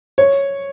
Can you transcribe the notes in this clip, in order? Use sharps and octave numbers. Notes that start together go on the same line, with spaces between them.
C#5